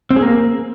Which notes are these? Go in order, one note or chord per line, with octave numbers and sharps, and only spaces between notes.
C4
G#4
A#3